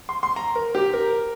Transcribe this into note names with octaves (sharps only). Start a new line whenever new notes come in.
C6
C6
A#5
A#4
G4
A#4